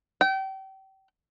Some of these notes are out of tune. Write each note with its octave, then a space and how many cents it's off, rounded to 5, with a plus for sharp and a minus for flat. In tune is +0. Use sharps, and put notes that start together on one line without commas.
G5 -30